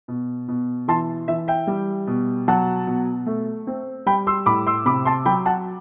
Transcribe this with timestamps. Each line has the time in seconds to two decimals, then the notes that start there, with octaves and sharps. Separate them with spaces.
0.08 B2
0.48 B2
0.88 E3 A5 C6
1.28 E3 E5
1.48 E5 G5
1.67 G3
2.07 B2
2.48 F#3 F#5 A5
2.87 B2
3.26 A3
3.67 C4
4.06 G3 G5 B5
4.27 C6 E6
4.46 A2 B5 D6
4.67 C6 E6
4.86 C3 B5 D6
5.05 A5 C6
5.26 F#3 G5 B5
5.46 F#5 A5